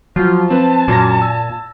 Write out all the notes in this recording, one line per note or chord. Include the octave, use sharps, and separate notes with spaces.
F3 F#3 F4
C4 B4 A5
F#2 A#2 G#6 A#6
E6